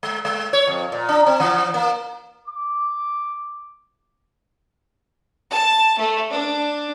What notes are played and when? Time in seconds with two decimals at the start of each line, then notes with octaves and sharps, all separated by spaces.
0.03 G#3
0.25 G#3
0.53 C#5
0.67 F2
0.92 A#2
1.09 D4
1.27 C4
1.40 E3
1.74 A#3
2.48 D6
5.53 A5
5.99 A3
6.31 D4